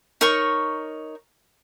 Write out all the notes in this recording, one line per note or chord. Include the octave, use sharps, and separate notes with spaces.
D#4 A#4 C#5 C#6